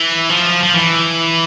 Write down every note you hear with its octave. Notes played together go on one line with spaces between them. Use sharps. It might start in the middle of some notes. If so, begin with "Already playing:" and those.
Already playing: E3
F3
F3
E3